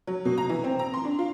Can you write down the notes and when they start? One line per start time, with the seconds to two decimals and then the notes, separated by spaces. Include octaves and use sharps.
0.07 F#3
0.25 B2
0.38 A#5
0.49 E3
0.64 C4
0.79 A#5
0.94 C6
1.05 D4
1.19 F4